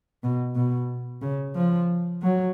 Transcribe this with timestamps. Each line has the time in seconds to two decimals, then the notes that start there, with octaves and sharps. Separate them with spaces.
0.23 B2
0.55 B2
1.22 C#3
1.56 F3
2.22 F#3